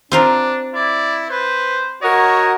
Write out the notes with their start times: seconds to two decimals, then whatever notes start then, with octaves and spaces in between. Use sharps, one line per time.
0.12 C4 D4 F4 A#4
0.75 E4 D5
1.30 B4 C5
2.02 F#4 A#4 C#5 D#5